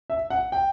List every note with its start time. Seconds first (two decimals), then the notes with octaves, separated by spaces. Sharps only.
0.10 E5
0.30 F#5
0.52 G5